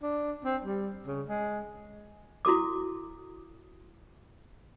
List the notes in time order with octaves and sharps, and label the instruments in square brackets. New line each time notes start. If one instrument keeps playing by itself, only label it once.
[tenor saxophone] D4
C4
G3
C#3
G#3
[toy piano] E4 F#4 A4 D6